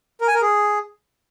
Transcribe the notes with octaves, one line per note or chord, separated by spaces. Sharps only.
A#4
G#5
A#4
G#4